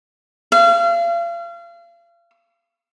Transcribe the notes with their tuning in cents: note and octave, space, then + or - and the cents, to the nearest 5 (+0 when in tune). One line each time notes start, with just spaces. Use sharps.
F5 -35